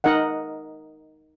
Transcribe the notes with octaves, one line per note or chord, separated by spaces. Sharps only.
D#4 A#4 D#5 F#5